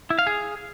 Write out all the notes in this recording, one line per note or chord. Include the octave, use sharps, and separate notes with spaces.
E4
F5
G#4